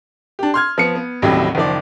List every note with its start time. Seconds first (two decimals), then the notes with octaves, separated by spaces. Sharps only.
0.39 D4 G4
0.54 C6 F6 G#6
0.78 F3 B3 C#7
0.96 B3
1.22 A1 D#2 A2 C3 F#3 G3
1.55 F#1 D#3 F3 D5